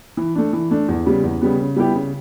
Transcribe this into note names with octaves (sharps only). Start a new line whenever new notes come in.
E3
A3 D4
E3
A3 D4
E2
C#3 G3 B3
E2
C#3 G3 B3
C#3
G3 B3 E4 G4
C#3